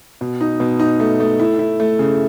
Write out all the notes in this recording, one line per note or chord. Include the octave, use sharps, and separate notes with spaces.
B2
D#4
B2
D#4
A3
A3
E4
E4
A3
C#3